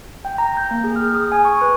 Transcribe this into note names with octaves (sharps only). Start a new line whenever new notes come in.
G5
A#5
G6
A#3
G#4
F6
D#6
G#5
C#6
B4